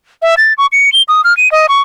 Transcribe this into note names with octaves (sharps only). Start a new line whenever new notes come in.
E5
A6
C#6
C#7
G7
D#6
F6
D#7
D#5
C#6